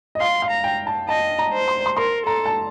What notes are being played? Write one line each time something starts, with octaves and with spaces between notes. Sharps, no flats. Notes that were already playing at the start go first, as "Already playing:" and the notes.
D#5
F5 C6
F5
A#5
G5
A5
D#5 A5
A#5
C5
C6
C6
A#4 C6
A4 A#5
A5